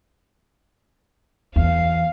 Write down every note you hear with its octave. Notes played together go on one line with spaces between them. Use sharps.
E2 F5